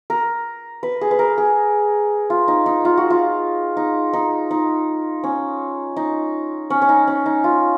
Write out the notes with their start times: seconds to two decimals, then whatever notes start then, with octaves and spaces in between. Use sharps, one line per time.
0.10 A#4
0.83 B4
1.01 G#4
1.11 B4
1.19 A#4
1.38 G#4
2.30 F4
2.48 D#4
2.66 D#4
2.85 F4
2.97 F#4
3.10 F4
3.77 D#4
4.13 D#4
4.51 D#4
5.24 C#4
5.97 D#4
6.70 C#4
6.82 C#4
6.89 D#4
7.08 C#4
7.26 D#4
7.44 F4